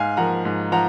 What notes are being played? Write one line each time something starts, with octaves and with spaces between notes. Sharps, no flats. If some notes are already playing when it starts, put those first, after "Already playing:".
Already playing: G#2 F5 G#5
F3 A#3 F#5 A#5
G#2
F3 F#5 A#5